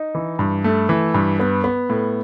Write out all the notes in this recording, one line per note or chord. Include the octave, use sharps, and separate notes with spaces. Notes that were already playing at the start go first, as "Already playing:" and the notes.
Already playing: D#4
E3
G2
A3
E3
G2
B3
B3
A2